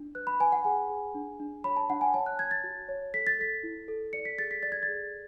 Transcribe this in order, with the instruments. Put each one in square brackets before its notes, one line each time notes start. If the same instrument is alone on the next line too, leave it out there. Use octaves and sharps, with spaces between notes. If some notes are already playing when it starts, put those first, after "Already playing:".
Already playing: [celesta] D4
B4 F#6
B5
B4 G#5
F#5
G#4 G#5
G#4
D4
D4
C#5 B5
A5
D4 F#5
G#5
C#5 A5
F#6
C#5 G#6
A6
F#4
C#5
A4 B6
A6
A4 B6
E4
A4
D5 C#7
B6
G#4 A6
B6
D5 A6
G#6
A6
G#4